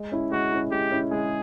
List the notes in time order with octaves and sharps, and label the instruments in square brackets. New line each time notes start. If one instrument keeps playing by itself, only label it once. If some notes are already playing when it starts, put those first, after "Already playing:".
Already playing: [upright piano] G#3
C#4 E4
[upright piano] G#3 [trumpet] F#4
[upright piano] C#4 E4
[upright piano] G#3 [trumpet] G4
[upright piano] C#4 E4
[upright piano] G#3 [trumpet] G#4